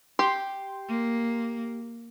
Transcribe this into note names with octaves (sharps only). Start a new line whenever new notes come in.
G4 C6
A#3